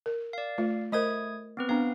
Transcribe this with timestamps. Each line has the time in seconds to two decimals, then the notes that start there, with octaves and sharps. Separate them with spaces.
0.06 A#4
0.33 D5 F5
0.58 A3 F4
0.92 A3 A#4 C5 D#5 D#6 G#6
1.57 B3 C4 B4
1.69 B3 D4 F5